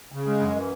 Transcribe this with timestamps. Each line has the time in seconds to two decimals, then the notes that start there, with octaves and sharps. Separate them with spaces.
0.12 C#3
0.26 G#3
0.40 F#2
0.56 E3